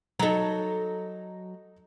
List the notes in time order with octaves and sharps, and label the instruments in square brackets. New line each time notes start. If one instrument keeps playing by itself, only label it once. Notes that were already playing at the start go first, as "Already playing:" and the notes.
[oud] F#3 A4 [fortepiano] D#4 A#5